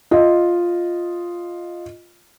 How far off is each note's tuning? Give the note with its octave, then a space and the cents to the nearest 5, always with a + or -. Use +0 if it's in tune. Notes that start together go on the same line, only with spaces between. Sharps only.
F4 +0 D#5 -5